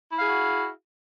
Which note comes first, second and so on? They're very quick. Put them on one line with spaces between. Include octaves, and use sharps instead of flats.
E4 F5 G#4 F#4